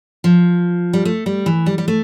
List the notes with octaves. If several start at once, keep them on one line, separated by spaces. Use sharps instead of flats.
F3
G3
A3
G3
E3
G3
G3
A3